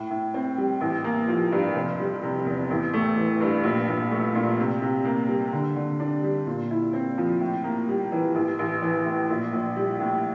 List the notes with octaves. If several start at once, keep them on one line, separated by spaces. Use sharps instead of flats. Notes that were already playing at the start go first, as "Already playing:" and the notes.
Already playing: A2
A2
C4
G3
A1
A#3
F3
G2
F1
G3
C3
E2
A1
A3
E3
G2
A#1
A#1
A3
A#2
C3
C3
A#3
G3
D3
D3
D4
G3
A#2
E4
C4
F3
A2
A#3
G3
E3
A1
A1
E3
A2
A#1
A#1
G3
A2